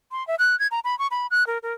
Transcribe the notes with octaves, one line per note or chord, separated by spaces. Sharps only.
C6
E5
F#6
G#6
A#5
B5
C#6
B5
F#6
A#4
A#4